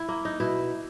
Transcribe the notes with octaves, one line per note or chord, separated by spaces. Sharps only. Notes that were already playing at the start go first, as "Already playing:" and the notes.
Already playing: E4
A#3
D#4
B2 E4